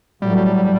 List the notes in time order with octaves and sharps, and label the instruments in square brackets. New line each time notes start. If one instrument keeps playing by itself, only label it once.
[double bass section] A2 F#3 A3 [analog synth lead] G3